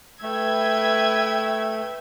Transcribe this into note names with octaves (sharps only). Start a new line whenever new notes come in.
A3 B4 E5 G5 G#6